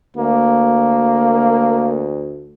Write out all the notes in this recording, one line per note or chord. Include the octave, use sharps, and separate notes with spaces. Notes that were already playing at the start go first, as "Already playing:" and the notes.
D2 A#3